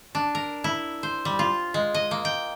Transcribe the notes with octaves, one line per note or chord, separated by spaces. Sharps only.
D4
A#4
E4
C5
G3
F4
G#3
D#5
A#3
G5